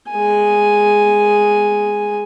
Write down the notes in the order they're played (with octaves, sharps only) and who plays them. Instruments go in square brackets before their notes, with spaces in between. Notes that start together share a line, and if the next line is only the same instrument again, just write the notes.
[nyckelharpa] G#3 G#5